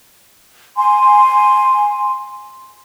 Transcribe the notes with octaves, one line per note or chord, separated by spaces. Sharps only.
G#5 C6